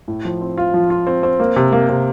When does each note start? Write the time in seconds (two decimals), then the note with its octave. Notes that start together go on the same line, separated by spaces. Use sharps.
0.08 A2
0.25 F3
0.41 C4
0.58 F4
0.74 F3
0.90 F4
1.07 C4
1.23 C4
1.40 A#3
1.56 C3
1.72 A#3
1.89 C3